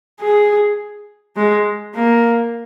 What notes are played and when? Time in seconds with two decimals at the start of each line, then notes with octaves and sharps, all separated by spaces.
0.21 G#4
1.36 G#3
1.94 A#3